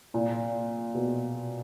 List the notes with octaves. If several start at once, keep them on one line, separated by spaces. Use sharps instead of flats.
A#2
B2